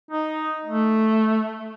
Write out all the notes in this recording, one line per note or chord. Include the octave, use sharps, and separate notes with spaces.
D#4
A3